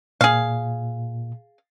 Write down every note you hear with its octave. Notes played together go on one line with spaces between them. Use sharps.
A#2 G#4 F5